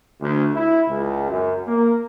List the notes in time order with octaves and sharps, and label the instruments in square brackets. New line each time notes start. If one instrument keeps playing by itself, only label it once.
[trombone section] D2
E4
C#2
F#2
A#3